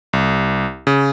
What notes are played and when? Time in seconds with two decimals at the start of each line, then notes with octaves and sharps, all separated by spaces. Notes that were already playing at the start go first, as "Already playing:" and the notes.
0.13 C2
0.87 C#3